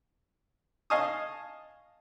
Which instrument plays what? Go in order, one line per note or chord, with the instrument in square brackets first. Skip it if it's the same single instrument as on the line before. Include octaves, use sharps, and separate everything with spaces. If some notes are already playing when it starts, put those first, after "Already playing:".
[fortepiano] D#5 F5 G#5 A5 C#6 D#6